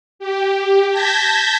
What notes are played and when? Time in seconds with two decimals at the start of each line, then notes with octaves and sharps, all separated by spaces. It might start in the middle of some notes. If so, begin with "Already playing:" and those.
0.19 G4
0.91 A5 G6 G#6 A#6 B6